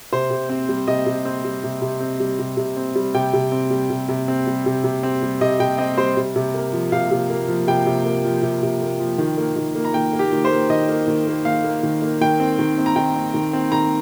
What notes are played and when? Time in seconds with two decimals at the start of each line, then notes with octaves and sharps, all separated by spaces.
0.13 C3 C5
0.30 C3
0.49 C4
0.69 G3
0.88 C3 D#5
1.06 C3
1.25 C4
1.44 G3
1.64 C3
1.82 C3
2.00 C4
2.20 G3
2.39 C3
2.57 C3
2.77 C4
2.95 G3
3.14 C3 G5
3.33 C3
3.52 C4
3.70 G3
3.90 C3
4.09 C3
4.28 C4
4.47 G3
4.66 C3
4.84 C3
5.03 C4
5.23 G3
5.41 C3 D#5
5.60 C3 G5
5.78 C4 D#5
5.98 G3 C5
6.17 C3
6.36 C3
6.54 A#3
6.73 F3
6.92 C3 F5
7.11 C3
7.30 A#3
7.48 F3
7.67 C3 G5
7.86 C3
8.05 A#3
8.25 F3
8.43 C3
8.63 C3
8.81 A#3
9.00 F3
9.18 D#3
9.38 A#3
9.56 D#3
9.75 A#3
9.85 A#5
9.94 D#3 G5
10.13 A#3
10.19 G4
10.32 D#3
10.45 C5
10.51 A#3
10.69 D#3 D#5
10.89 A#3
11.07 D#3
11.27 A#3
11.45 D#3 F5
11.64 A#3
11.83 D#3
12.02 A#3
12.21 D#3 G5
12.40 C4
12.59 D#3
12.78 C4
12.86 A#5
12.96 D#3 G5
13.16 C4
13.34 D#3
13.53 C4
13.72 D#3 A#5